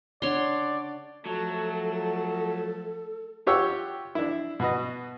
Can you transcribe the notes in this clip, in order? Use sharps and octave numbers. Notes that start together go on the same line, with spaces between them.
C#3 D4 C#5 D5 F#5 C6
F3 F#3 A3 A4 A5
F4 G4 C#5 F#5 E6
D4 E4
B2 F#4 B4 D#5